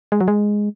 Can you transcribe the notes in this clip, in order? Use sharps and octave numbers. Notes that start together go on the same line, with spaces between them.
G#3
F#3
G#3